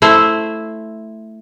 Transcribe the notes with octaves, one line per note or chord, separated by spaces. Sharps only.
A3 E4 C5